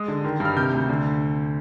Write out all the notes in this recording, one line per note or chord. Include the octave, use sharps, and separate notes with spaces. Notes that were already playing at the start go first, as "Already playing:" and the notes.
Already playing: G#3 D#6
D3
D#3
G2
F6
C3 G6
D2
D3